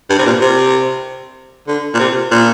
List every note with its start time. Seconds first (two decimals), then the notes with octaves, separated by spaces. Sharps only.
0.10 G2
0.18 C3
0.26 A#2
0.41 C3
1.67 D3
1.94 A#2
1.99 C3
2.31 A#2